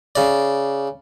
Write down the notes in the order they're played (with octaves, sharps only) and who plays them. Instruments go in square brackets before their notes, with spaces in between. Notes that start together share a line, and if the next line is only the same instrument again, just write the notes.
[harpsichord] C#3 D5